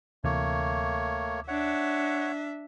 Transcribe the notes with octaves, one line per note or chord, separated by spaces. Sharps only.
D2 C3 E3 A3 A#3 C#5
D4 C#5 E5 F#5